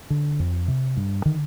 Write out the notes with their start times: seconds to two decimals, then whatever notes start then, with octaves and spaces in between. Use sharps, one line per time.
0.10 D3
0.39 F2
0.68 C3
0.97 G2
1.25 D3 D#3